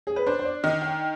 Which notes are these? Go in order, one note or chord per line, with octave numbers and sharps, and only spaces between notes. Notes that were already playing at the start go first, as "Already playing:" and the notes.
G#4
B4
D4 C5
C5
D5
D#3 D#5
G5